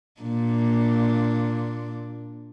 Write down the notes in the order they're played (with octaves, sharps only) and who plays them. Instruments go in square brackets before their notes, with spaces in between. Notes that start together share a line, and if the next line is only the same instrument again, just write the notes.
[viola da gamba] A#2 D4